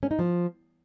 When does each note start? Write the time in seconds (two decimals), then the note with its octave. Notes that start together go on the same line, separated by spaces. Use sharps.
0.03 C#4
0.11 D#4
0.19 F3